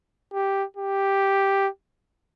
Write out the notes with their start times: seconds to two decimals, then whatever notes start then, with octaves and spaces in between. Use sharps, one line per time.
0.34 G4
0.77 G4